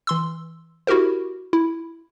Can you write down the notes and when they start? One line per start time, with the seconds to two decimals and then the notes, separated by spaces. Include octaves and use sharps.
0.07 E3 C6 E6
0.87 E4 F#4 G4 A#4 C5
1.53 E4